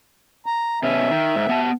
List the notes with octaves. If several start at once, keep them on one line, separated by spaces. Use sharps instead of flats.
A#5
B2 C#4 E5
D#3
G#2
B3 F#5 A5